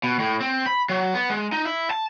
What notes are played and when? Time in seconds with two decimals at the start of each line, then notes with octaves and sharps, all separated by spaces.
0.04 B2
0.19 A2
0.41 C4
0.66 B5
0.89 F#3
1.14 B3
1.30 G#3
1.52 D#4
1.65 E4
1.90 A5